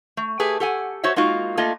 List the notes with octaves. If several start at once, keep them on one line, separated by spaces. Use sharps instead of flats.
A3
A3 G4 G#4 B4
G4 A4 F#5 G#5
F#4 C5 C#5 E5
G#3 A#3 D#4 F4 F#4
A3 A#3 F4 D#5